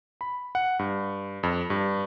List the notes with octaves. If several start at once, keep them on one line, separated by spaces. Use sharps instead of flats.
B5
F#5
G2
F2
G2